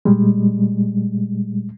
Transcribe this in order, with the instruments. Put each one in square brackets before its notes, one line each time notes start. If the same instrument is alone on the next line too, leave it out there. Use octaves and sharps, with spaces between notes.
[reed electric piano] A#2 G3 G#3